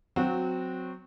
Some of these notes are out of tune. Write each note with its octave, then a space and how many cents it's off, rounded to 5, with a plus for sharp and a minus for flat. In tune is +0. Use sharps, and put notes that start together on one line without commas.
F#3 -10 C4 -15 F#4 -20